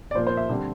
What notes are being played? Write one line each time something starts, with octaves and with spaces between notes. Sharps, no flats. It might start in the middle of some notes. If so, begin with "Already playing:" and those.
D5
A#2 F3 A#3 C5
C5
E5
D3 G3 C4